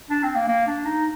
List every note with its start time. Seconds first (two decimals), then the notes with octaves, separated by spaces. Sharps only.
0.10 D4
0.23 C4
0.36 A#3
0.48 A#3
0.67 D4
0.85 D#4